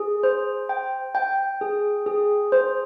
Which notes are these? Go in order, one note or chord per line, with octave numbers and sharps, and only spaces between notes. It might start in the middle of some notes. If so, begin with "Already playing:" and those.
Already playing: G#4
C5
G5
G5
G#4
G#4
C5